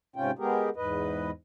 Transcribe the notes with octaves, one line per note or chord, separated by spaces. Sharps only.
G#2 C3 C#4 F4 G5
G#3 B3 G4 G#4 A#4
E2 G#2 B4 D#5